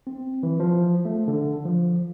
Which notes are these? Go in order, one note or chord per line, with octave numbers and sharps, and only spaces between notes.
C4
E3
F3
A3
D3
F3